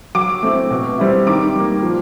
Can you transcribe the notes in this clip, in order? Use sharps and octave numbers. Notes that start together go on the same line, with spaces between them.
F#3 D6
A3 C4 E4
B2
G3 C4 E4
D#3 D6
G3 A#3
F3